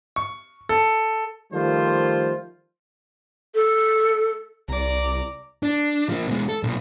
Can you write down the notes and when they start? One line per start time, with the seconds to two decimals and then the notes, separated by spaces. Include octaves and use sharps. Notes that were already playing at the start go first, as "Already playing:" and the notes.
0.16 C#6
0.69 A4
1.53 D#3 F3 G3 A3 F4 C5
3.55 A4
4.68 C2 D5 A#5
5.63 D4
6.09 F3 A#3
6.27 B2 G#3
6.49 A4
6.63 B1 A#2